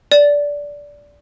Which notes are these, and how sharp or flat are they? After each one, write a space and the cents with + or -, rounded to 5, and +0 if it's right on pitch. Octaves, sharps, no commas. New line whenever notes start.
D5 -15